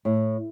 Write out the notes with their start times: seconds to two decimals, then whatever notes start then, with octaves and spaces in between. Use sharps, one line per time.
0.05 A2